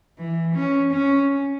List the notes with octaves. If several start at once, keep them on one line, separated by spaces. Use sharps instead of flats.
E3
C#4
C#4